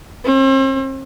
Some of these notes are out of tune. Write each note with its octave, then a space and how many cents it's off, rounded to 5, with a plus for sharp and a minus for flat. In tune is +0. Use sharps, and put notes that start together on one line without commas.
C4 +40